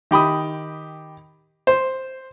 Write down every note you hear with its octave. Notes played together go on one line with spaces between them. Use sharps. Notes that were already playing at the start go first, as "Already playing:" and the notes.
D#3 G4 B5 D#6
C5